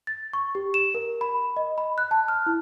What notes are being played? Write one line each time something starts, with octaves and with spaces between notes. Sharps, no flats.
A6
C#6
G4
E7
A#4
B5
D#5
B5
F#6
A5
F6
E4